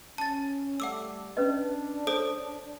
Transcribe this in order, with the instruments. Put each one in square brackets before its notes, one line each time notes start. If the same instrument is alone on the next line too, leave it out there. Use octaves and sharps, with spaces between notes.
[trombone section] C#4 [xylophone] A5 A6
[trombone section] G3 A3 [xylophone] F#5 D6 E6
[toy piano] C#4 B4 D#5 [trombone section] D4
[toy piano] A4 [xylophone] C5 C#5 D7